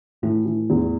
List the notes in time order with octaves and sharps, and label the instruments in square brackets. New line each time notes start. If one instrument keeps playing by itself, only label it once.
[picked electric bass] A2 [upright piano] E3
[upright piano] E3
E2